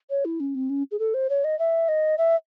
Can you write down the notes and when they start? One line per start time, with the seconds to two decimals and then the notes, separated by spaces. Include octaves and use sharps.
0.10 C#5
0.25 E4
0.40 C#4
0.55 C4
0.70 C#4
0.91 G#4
0.99 A4
1.14 C5
1.30 C#5
1.44 D#5
1.59 E5
1.88 D#5
2.18 E5